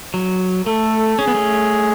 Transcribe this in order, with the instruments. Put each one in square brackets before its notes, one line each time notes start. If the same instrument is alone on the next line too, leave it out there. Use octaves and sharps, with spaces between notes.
[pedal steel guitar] F#3
[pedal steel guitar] A3 [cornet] A4
[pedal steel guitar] C#4 [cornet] G#4
[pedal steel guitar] B3
A3 C#4